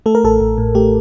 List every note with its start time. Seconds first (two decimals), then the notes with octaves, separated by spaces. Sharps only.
0.06 A3 A4
0.15 A#4
0.24 A1 A4
0.40 A1
0.58 A2
0.75 A3 G4